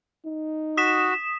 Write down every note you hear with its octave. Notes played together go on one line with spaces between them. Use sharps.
D#4
F#4 D#6 B6 E7